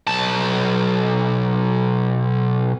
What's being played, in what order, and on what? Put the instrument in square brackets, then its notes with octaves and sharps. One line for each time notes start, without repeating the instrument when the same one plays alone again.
[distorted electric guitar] B1 A5